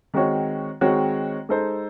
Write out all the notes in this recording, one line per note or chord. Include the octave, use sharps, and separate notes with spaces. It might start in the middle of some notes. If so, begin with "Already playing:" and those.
D#3 G#3 C4 F#4 C#5
D#3 G#3 C4 F#4 C#5
G#3 D#4 A4 C5